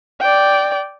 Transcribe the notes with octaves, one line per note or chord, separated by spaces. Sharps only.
D5 G5